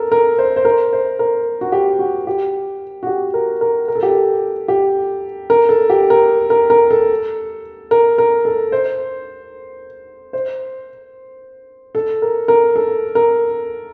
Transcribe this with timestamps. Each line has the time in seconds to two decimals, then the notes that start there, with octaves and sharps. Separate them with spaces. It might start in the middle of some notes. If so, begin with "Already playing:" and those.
Already playing: A4 A#4
0.12 A#4
0.38 C5
0.56 C5
0.65 A#4
0.93 C5
1.19 A#4
1.61 F#4
1.72 G4
1.99 F#4
2.27 G4
3.03 F#4
3.07 G4
3.34 A#4
3.61 A#4
3.88 A#4
3.95 A4
4.03 G4
4.09 A4
4.68 G4
5.50 A#4
5.69 A4
5.90 G4
6.10 A#4
6.50 A#4
6.70 A#4
6.91 A4
7.91 A#4
8.18 A#4
8.45 A4
8.72 C5
10.33 C5
11.95 A4
12.22 A#4
12.48 A#4
12.76 A4
13.15 A#4